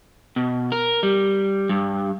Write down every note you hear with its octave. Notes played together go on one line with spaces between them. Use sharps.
B2
A#4
G3
G2